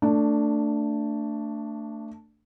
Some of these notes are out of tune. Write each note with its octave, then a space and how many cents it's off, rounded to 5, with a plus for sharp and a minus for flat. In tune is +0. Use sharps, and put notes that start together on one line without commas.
A3 +25 D4 +0